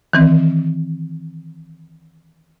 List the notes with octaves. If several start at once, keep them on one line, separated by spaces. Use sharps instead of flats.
D#3 E3 C4